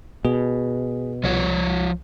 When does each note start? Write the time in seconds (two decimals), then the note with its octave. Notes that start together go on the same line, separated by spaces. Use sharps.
0.25 B2 G#4
1.24 C2 F3 F4 C#5